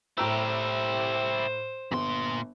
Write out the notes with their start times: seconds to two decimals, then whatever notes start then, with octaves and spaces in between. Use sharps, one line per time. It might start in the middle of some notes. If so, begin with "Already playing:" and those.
0.17 A2 E4 G4 C5 A#5 E6
1.92 G1 A#2 C6